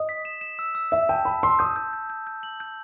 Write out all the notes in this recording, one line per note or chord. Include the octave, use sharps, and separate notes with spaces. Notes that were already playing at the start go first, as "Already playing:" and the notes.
Already playing: D#5 D#6
B6
E7
E7
E6
E6
E5 E6
G5 A5
A5 B5
C6 E6
D#6 G6
G6
G6
G6
G6
F#7
G6